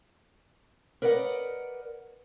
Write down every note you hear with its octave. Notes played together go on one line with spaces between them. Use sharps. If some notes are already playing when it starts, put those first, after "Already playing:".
A#4 B4 D5 D#5 F#5